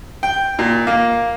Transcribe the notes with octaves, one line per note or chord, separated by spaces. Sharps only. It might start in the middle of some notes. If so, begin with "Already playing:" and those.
G5
A#2
A#3